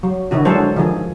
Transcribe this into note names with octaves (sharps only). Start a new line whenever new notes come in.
F#3
D3 D#3 E4 F#4
F#3 G#3 D4 G#4 A4 C5
D#3 F3 G#4